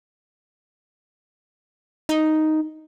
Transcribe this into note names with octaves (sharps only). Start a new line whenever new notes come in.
D#4